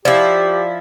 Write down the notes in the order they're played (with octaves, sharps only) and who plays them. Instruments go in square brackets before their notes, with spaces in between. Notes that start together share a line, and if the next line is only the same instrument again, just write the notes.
[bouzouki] F3 E4 [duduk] G4 [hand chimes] D5